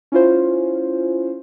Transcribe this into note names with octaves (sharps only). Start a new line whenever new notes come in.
C#4 E4 F4 C5